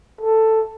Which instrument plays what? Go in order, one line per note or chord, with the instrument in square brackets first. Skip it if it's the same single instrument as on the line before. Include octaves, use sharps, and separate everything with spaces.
[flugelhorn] A4